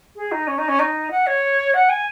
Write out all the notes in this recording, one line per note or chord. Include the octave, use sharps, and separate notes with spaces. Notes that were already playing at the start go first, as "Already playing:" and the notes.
G#4
D#4
C#4
D#4
C#4
D#4
F#5
C#5
F#5
G#5